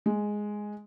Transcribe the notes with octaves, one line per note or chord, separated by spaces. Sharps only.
G#3